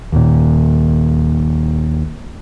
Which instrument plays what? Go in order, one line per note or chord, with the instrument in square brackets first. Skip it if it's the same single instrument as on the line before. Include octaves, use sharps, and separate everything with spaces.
[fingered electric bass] D#2 A#2